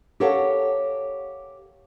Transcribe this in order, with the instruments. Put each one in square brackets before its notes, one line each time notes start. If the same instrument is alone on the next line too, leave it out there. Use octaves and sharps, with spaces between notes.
[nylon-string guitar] G4 A4 A#4 C#5 F5 F#5